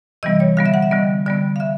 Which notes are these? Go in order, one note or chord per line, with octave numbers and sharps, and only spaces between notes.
C3 E3 G3 B3 D#5
C#5
D3 G3 B3 F5
E5
F#5
E5
D3 G3 B3 D#5
D3 G3 B3 D5
F5
D3 E5